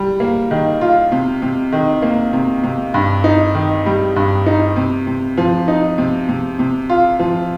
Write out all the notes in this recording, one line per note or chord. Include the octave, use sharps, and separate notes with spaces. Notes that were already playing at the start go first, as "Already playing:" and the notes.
Already playing: G3
A#3
D#3
F4
C3
C3
D#3
A#3
C3
C3
G2
D#4
D#3
G3
G2
D#4
C3
C3
F3
D#4
C3
C3
C3
F4
F3